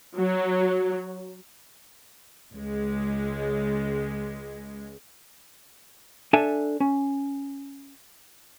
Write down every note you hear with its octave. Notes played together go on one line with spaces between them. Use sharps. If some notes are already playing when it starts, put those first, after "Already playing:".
F#3
C#2 G#3
D4 A4 E5 G#5
C#4